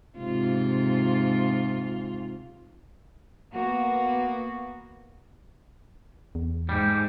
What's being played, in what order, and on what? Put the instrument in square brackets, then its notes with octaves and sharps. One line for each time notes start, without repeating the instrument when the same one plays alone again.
[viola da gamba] G#2 C3 F4
[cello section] A#3 B3 F#4
[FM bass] E2
[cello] G#2 [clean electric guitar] G3 G4